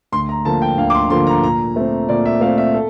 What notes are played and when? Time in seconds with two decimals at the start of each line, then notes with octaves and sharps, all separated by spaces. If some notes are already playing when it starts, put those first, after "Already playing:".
0.12 D2 C6
0.29 A#5
0.45 D3 F3 A#3 A5
0.62 G5
0.77 D2 F5
0.90 D6
0.95 C6
1.10 D3 F3 A#3 C6
1.27 A#5
1.43 A#2 A#5
1.76 A3 C4
2.09 A#2 D5
2.26 E5
2.41 A3 F5
2.45 C4
2.58 E5
2.74 A4